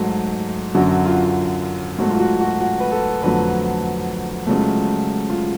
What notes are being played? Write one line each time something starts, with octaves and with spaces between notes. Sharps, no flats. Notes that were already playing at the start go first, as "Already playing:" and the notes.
Already playing: G#2 F#3 A3
F#2 D3 F#3 F#4
F4
G#2 F#3 A3 F#4
F4
F#4
F#4
F#4
B4
A4
F2 D3 F#3 A3 B4
C#2 C#3 F#3 A3
F4